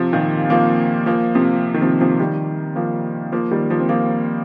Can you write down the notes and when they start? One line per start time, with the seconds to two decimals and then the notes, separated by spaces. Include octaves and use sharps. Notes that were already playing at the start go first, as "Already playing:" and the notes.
Already playing: C3 F3
0.13 A#2 D#3
0.50 F3 A#3
1.06 F3 A#3
1.35 C3 F3
1.74 D#3
1.82 C3 F3
2.01 C3 F3
2.19 D#3 G3
2.76 F3 A#3
3.32 F3 A#3
3.51 D#3 G3
3.70 F3 A#3
3.80 C4
3.89 F3 A#3